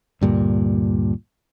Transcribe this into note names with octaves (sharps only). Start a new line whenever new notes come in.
D2 G2 A#2